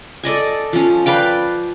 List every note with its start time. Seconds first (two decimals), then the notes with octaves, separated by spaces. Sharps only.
0.23 A4 D5 D#5 G#5
0.73 F3 C#4
1.06 B4 D5 F5 G5